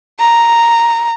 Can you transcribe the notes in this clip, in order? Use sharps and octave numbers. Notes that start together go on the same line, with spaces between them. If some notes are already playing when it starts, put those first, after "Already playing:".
A#5